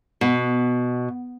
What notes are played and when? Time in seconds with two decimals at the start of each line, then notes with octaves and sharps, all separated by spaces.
0.21 B2